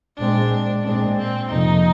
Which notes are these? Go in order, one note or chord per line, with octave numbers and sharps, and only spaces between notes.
A#2 G#3 C4 D4
A#2 G#3 C4 D4
C4
F2 C3 F3 A#3 D#4